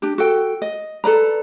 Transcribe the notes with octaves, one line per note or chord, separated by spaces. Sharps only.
D4 G4
F#4 A4 G5
D#5
A4 B4 D5 A#5